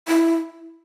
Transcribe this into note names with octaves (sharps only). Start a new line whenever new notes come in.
E4